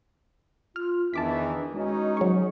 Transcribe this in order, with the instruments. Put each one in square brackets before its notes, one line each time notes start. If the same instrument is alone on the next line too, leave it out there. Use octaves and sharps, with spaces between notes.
[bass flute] F4 [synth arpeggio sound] F6
[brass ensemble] E2 D#3 E3 [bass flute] D4 [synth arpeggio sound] A5 D6 B6
[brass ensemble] G#3 C#4 D#4 [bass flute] F#4
[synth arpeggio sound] F#3 C#6 [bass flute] G#4